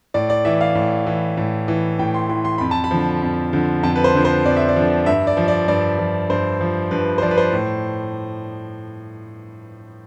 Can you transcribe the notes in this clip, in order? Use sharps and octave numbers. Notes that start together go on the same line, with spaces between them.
A2 D5
D5
E3 E5
F5
A2
E3
A2
E3
A2 G5
C6
E3 C6
C6
F2 B5
A5
B5
D3 F3
F2
D3 F3
F2 A5
B4
C5
D3 F3
C5
F2 D5
E5
D5
D3 F3
G2 E5
D5
F3
D5
G2 D5
F3
G2 C5
F3
G2 B4
C5
F3 D5
B4
C5
A2